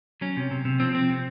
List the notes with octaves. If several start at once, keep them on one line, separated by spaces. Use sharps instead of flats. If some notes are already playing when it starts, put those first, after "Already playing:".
F#3 C#4
C3
C3
C3
F3 C4
C4
C3